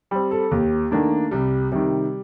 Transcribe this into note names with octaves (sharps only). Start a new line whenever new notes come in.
G3 C4
A4
D#2 G4
D#3 A3 A#3 D4
C2 G3
C3 D#3 G3